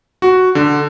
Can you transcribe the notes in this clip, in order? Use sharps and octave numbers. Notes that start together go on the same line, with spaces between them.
F#4
D3